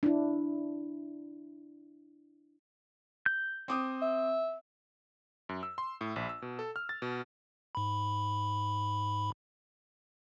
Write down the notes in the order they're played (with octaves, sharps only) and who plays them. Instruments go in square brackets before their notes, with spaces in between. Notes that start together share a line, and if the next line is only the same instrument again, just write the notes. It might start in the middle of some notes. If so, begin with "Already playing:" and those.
[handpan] D4 E4
[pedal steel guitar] G6
[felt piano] C4 D6 D#6
[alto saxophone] E5
[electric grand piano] F#2
E6
C6
A2
A#1
E6
B2
A4
F6
A6
B2
[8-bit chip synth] G#2 B5